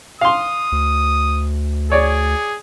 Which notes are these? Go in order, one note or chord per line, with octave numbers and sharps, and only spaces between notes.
F5 C6 D#6
D2
G#4 C#5 D5